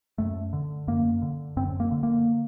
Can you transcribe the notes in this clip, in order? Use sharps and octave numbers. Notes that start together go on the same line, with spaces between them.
F#2 A3
D3
F#2 A#3
D3
F#2 C4
A#3
D3
A#3